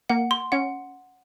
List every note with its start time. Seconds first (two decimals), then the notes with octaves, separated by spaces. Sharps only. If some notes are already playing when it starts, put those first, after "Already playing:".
0.10 A#3 F#5
0.31 C6
0.52 C#4 F#5